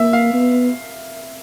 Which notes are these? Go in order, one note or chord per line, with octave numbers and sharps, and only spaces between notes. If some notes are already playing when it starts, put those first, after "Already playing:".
Already playing: A#3 E5
F5
B3